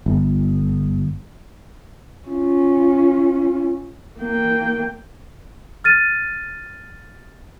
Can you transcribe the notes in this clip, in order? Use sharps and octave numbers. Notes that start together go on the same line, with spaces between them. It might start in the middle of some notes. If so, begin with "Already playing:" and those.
G1
C#4 F4
A#3 G5
F6 A6 D#7